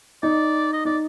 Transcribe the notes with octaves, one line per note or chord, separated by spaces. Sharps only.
D#4 D5
D#5
D#4 D5